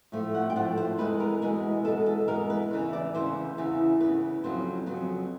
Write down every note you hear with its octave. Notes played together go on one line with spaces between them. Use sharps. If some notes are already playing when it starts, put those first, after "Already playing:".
A2 F3 A3
F#5
G5
A2 F3 A3 F#5
C5
E2 B2 G#3 B3 B4
A#4
E2 B2 G#3 B3 G#4
E2 B2 G#3 B3 A4
A4
E2 B2 G#3 B3 A#4
B4
E2 C#3 E3
D5
E2 C#3 E3 C5
E2 C#3 E3
E2 C#3 E3 B4
F2 C#3 F#3 B3 C5
F2 C#3 F#3 B3